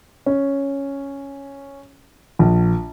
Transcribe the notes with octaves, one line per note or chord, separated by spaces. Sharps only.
C#4
A#1